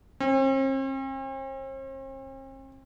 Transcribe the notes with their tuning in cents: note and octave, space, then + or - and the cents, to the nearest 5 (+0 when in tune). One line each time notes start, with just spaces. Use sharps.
C4 +45